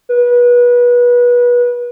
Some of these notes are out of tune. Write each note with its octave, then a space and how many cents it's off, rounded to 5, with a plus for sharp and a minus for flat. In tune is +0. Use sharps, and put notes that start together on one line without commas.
B4 -25